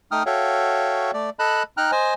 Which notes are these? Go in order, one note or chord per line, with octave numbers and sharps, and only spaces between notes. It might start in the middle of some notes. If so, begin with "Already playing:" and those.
A3 D#4 G5 D#6 F6
F#4 A4 C#5 E5 F5 G5
A3 D5
A4 D#5 A5 B5 F#6
D#4 G5 A#5 F6 F#6
C5 D#5 G#5